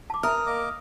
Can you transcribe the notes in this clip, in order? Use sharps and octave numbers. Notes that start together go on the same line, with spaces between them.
A5 D6
A#4 E5 D#6 F6
A#3 D#5 D6